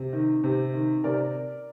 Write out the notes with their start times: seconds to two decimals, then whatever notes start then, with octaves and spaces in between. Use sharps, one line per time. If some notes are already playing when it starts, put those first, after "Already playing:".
Already playing: C3
0.13 D#3
0.44 C3
0.74 D#3
1.04 C3 A#4 D5